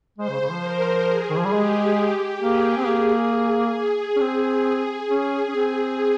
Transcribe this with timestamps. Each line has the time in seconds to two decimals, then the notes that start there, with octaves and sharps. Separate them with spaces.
0.18 G#3 C5
0.30 C#3
0.41 C#3
0.52 F3
0.63 A#4
1.08 G#4
1.30 D#3
1.38 F3
1.45 G3
1.52 G#3 G4
2.42 A#3 G#4
2.77 C4
2.87 A#3
3.76 G#4
4.16 C#4
4.21 C4
5.10 C#4
5.49 C#4
5.56 C4